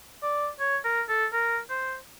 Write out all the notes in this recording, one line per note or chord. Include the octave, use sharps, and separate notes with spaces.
D5
C#5
A#4
A4
A#4
C5